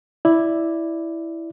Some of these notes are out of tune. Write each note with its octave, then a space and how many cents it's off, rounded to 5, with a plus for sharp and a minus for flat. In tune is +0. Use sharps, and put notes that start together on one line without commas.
E4 +0 D5 +0